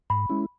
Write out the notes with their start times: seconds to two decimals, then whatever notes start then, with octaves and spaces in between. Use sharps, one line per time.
0.10 G#2 B5
0.29 G#3 C#4 E4